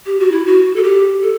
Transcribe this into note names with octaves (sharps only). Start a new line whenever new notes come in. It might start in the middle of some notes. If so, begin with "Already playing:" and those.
G4
F#4
E4
F#4
A4
G4
A4